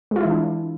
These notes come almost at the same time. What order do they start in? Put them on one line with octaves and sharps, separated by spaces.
G#3 F4 E4 E3 D4